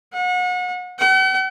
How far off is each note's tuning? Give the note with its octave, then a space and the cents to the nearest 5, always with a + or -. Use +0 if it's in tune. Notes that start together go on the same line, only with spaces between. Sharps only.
F#5 -35
F#5 +45